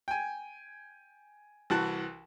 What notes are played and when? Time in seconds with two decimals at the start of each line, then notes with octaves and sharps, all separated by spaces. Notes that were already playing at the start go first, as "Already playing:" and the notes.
0.08 G5 G#5
1.70 C2 E3 F#4 A5 F#6